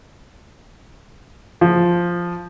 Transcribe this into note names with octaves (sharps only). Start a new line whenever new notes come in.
F3